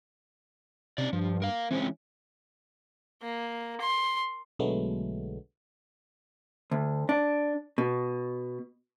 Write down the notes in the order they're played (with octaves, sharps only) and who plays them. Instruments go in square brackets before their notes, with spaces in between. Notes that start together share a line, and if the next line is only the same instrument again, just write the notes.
[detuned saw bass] C3 [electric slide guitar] C#4 D#4 D5
[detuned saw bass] G2 [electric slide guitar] F3
[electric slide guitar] A#4 F5
[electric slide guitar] E3 G#3 C#4 [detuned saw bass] C4
[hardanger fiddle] A#3
C6
[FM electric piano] B1 D3 F#3 G#3 A3 B3
[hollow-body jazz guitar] D2
D4
B2